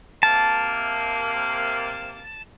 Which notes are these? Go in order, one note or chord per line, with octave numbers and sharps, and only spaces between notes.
C3 A#3 A5